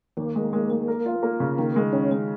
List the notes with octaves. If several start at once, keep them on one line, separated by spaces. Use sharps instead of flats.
D#2 A#3
G#3
G#3
G#3
A#4
F4
A#3
C#3
D#3 A#3
G#3
D#3 C#4
G#3